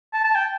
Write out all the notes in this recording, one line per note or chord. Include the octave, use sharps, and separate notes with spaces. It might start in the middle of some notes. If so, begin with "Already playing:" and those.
A5
A5
G5